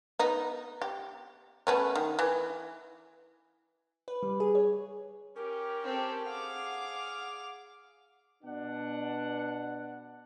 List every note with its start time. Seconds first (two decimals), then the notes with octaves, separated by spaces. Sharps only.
0.19 B3 D#4
0.82 G4
1.67 A3 B3 C#4
1.95 D#3
2.19 E3
4.08 B4
4.23 G3
4.40 G#4
4.55 C#5
5.36 C#4 G4 A#4
5.84 C4 A4
6.25 G#4 F5 F#5 D6 F7
8.43 B2 D4 F#5